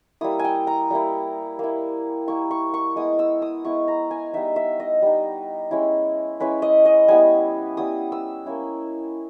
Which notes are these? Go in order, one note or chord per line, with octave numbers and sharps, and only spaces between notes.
G3 A#3 E4 D#6
G#5
G5
A#5
G3 A#3 E4
A#3 E4
A#3 E4 C#6
C#6
C#6
G#3 B3 E4 D#6
E6
D#6
G#3 B3 E4 C#6
A#5
G#5
G3 B3 D#4 E5
E5
D#5
G3 B3 D#4
G#3 C#4 E4
G#3 C#4 E4 B4
D#5
D#5
G3 B3 E4 G#5
G3 B3 E4 D#6
E6
A#3 C#4 E4